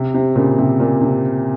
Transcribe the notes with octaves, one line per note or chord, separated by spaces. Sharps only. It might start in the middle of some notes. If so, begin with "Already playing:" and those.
Already playing: C3
C3
A#2 C#3
C3
A#2
C3